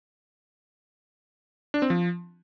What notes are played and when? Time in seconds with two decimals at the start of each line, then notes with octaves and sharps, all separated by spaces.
1.74 D4
1.82 C4
1.90 F3